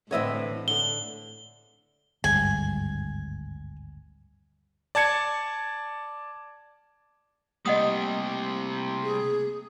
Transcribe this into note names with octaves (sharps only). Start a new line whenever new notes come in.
A2 D3 E3 C4 C#5 D#5 E5
D3 A4 G7
G#1 D2 G2 G#5
D5 A5 G#6 C#7
C3 G3 A3 A#3 D#5 F#5 D#6
G#4